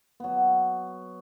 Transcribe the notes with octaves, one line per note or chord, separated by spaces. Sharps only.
F#3 B3